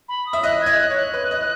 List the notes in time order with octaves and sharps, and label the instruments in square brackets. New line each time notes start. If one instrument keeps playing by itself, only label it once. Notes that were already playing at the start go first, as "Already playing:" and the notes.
[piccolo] B5
D#6
[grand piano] E5
[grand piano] D#5 [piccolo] F#6
[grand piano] D#5 [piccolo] G#6
[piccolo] F#6
[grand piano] C#5
[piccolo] F#6
[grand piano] B4
D#5